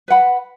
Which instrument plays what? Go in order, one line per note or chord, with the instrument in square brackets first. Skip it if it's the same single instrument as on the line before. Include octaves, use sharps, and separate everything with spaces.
[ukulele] B4 F#5 B5